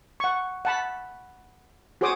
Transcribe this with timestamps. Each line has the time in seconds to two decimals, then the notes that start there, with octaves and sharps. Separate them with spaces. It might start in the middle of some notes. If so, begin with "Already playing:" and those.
0.20 F#5 C#6
0.65 F#5 A5 B5
2.01 F#4 G#4 C5 C#5 D6 D#6